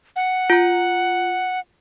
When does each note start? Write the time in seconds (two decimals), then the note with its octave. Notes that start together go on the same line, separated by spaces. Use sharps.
0.16 F#5
0.50 F4 A#5